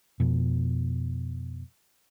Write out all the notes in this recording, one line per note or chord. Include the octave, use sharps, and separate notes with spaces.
F2 B2